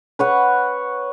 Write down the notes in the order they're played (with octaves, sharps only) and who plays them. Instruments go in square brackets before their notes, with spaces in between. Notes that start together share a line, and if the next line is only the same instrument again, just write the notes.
[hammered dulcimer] B4 C#5 F#5